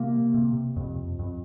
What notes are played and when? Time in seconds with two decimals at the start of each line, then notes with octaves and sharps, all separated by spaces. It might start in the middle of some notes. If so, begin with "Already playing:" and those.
Already playing: C3 A#3
0.34 C3
0.76 F2
1.19 F2